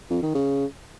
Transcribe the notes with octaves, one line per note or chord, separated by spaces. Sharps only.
F2
D#3
C#3